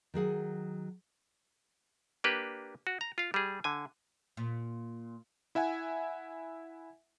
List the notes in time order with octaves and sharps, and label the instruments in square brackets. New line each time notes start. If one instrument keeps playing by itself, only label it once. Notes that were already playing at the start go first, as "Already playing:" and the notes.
[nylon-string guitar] D#3 F#3 G#4 F#5
[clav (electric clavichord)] A#3 D4 G4 B4
F#4
A#5
F4 F5
G3 G#4
D3 G#5
[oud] A#2
[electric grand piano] E4 E5 F#5 G#5